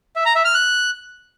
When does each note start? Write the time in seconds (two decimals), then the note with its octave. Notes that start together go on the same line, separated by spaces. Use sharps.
0.16 E5
0.25 A#5
0.35 E5
0.45 F6
0.55 F#6